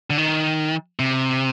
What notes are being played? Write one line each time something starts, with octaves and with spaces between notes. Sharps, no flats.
D3
D#3
C3